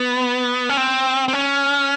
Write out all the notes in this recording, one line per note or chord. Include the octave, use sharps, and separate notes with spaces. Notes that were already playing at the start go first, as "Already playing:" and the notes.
Already playing: B3
C#4
C4
C4
C#4